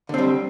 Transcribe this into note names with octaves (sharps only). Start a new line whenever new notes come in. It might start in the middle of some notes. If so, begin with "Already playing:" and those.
D3 G3 C4